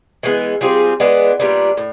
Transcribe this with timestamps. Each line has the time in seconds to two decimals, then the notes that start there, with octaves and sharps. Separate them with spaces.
0.23 E3 G#3 B3
0.61 G3 C4 F4 G#4
1.00 E3 G#3 B3 D4
1.40 A#2 G3 B3 D4
1.77 A2